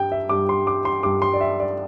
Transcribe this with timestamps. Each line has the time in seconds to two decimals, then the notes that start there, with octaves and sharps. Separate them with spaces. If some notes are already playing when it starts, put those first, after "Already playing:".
Already playing: G2 G3 G5
0.12 E5
0.29 G2 G3 D6
0.49 C6
0.67 D6
0.85 C6
1.03 G2 G3 D6
1.22 C6
1.34 D5
1.41 E5
1.60 D5